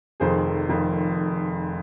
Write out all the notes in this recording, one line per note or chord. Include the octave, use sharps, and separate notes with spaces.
F1 F2 D#3 G#4 C5
F1 F2 D#3